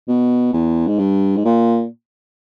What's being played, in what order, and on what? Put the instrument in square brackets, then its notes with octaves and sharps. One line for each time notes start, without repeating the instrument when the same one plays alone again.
[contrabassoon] B2
E2
G#2
G2
G#2
A#2